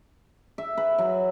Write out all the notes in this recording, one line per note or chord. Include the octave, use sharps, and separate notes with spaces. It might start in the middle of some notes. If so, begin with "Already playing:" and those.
E5
B4
F#3